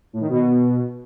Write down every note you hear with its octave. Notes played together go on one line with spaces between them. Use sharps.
A2
D#3
B2